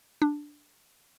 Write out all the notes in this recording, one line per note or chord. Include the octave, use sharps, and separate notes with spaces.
D4